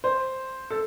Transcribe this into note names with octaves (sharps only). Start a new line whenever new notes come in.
C5
A4